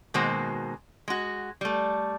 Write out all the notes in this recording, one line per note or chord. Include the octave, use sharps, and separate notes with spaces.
B2 D#3 G#3 A#3 F#4 C5
G#3 F#4
G3 A3